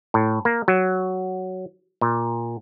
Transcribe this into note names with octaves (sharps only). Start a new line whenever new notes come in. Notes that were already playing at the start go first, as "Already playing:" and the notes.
A2
A#3
F#3
A#2